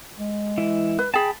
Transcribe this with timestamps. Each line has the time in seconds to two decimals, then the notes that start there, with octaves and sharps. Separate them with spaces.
0.19 G#3
0.58 E3 E4
0.99 B4
1.14 G#4 G5 A5 B5